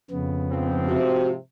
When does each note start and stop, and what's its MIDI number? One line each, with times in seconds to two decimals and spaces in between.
0.11 0.96 41
0.11 0.96 49
0.11 0.96 59
0.52 1.35 44
0.52 1.35 53
0.52 1.35 60
0.88 1.36 48
0.88 1.31 66